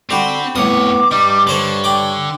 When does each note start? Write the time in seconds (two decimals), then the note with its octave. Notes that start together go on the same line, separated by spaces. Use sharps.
0.10 D3 C4 F#4 G4 B5
0.56 F2 A2 B3 C#5 D6 D#6
1.11 G2 G3 D#4
1.47 D3 A4 C5 C#5 D6
1.84 D5 G5 D6